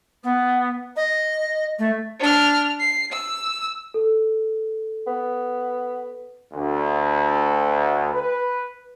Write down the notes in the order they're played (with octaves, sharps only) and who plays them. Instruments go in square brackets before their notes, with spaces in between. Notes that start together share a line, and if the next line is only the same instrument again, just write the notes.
[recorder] B3
D#5
A3
[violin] D4 F6
C7
E6
[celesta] A4
[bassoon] B3
[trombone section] D2
B4